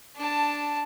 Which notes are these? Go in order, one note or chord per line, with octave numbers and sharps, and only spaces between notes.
D4 A5